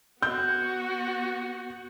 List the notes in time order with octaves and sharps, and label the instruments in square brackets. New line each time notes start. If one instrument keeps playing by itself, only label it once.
[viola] B3 F#4 [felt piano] G6